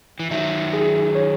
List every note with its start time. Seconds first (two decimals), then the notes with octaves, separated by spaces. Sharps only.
0.19 E3
0.31 D#3 F#3 E5
0.73 G#4
1.15 C#5